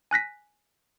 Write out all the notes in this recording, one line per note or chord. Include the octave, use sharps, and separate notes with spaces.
G#5 F#6 A#6 B6